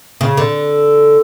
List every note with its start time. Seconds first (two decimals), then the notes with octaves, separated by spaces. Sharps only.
0.21 C#3
0.37 D3